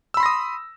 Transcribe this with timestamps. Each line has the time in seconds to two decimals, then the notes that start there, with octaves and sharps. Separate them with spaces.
0.14 E6
0.17 B5
0.20 C6
0.23 A#6
0.26 D#6